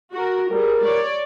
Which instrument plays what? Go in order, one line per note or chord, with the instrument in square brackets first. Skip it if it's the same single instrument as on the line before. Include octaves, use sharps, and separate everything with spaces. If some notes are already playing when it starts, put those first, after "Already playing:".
[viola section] F#4 A#4
[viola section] G3 G#4 [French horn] A#4
[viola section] C#5 D5